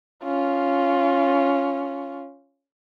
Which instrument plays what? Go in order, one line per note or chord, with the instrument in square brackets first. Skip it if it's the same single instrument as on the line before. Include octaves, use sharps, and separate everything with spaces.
[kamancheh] C#4 F4